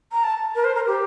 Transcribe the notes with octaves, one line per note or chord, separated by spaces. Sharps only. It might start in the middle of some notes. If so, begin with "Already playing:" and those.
A#5
A5
A#4
C5
A#4
G4